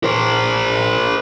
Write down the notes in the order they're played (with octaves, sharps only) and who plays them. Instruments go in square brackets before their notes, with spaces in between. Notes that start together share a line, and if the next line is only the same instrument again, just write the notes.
[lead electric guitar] A#4 C5